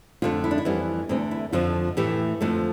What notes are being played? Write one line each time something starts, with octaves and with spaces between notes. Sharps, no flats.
F2 D3 A3 F4
E4
D4
E4
F2 E3 G3 B3
E2 D3 A3 C4
E4
F2 D3 F3 F4
A2 E3 A3 G4
F2 D3 F3 A3